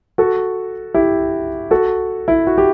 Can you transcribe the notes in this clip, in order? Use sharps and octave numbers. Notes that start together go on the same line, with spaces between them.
F#4 A4
E4 G4
F#4 A4
E4
F#4
G4